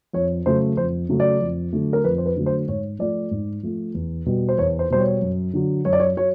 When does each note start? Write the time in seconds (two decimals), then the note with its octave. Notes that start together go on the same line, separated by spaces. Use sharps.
0.13 F2 C#5
0.46 C#3 F#3 A3 C5
0.77 F2 C5
1.09 C#3 F#3 A3
1.20 D5
1.41 F2
1.73 D3 F#3 A3
1.93 A#4
2.04 F2 B4
2.18 C5
2.26 B4
2.36 D3 F#3 A3
2.46 C5
2.68 G#2 C#5
2.99 F3 A3 D5
3.31 G#2
3.63 F3 A3
3.94 E2
4.26 B2 G3
4.49 C5
4.58 E2 C#5
4.79 C5
4.90 B2 G3 C5
5.00 C#5
5.22 F#2
5.53 D3 F#3
5.85 F#2 C#5
5.93 D5
6.00 C#5
6.17 F#3 C#5